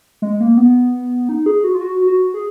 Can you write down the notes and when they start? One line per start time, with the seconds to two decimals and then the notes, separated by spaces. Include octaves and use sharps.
0.22 G#3
0.40 A#3
0.57 B3
1.29 D#4
1.46 G#4
1.64 F#4
1.75 F4
1.81 F#4
2.07 F#4
2.34 G#4